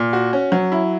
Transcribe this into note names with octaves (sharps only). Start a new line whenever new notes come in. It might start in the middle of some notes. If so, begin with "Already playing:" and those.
Already playing: A#2
F#4
C#4
F#3
E4